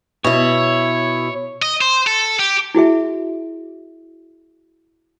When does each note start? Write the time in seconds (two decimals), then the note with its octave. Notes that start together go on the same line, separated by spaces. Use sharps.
0.24 B2 E4 C#5
1.62 D#5
1.81 C5
2.07 A4
2.39 G4
2.75 E4 F#4 G#4 E5